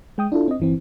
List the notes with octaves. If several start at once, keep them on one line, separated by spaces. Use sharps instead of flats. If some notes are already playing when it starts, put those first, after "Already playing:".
G#3 G5 D#6
D4 E4 F4 A4
C4 D#5
G1 E3 C4